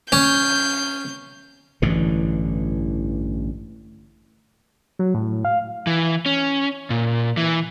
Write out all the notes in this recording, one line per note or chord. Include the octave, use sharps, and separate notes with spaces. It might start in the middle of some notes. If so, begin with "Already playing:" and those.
C#4 G6
A1 G2 D3 E3
F#3
A2
F5
E3
C#4
A#2
E3